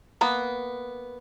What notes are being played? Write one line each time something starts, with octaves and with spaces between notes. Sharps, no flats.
A#3 B3 B4